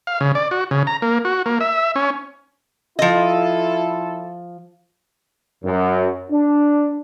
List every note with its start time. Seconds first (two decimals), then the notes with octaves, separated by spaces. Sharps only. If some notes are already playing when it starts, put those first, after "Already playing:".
0.07 F5
0.21 C#3
0.35 D5
0.51 F#4
0.71 C#3
0.87 A#5
1.02 A#3
1.25 F#4
1.46 A#3
1.60 E5
1.96 C#4
2.99 F3 E4 F4 A4 D#5
5.64 F#2
6.31 D4